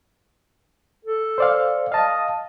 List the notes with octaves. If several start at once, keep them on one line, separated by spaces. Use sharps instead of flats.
A4
C5 D5 F5
D#5 F5 A5